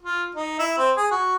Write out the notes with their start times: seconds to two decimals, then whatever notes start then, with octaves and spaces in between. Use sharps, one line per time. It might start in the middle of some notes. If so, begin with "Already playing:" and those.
0.02 F4
0.35 D#4
0.59 E4
0.78 C4
0.97 G#4
1.11 F#4